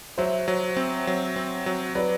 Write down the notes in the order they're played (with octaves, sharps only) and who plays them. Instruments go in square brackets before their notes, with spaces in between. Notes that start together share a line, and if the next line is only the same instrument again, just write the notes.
[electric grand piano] F#3 [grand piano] C5 E5
[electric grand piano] F#3
C4
F#3
C4
F#3
[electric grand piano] F#3 [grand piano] B4 D5